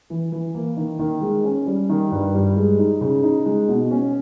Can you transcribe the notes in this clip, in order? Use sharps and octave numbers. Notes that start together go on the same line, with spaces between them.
E3
E3
A#3
D#3
D#3
G#3
C#4
G3
D#3
G2
G3
G#3
D#4
C#3
D#4
G#3
B2
C#4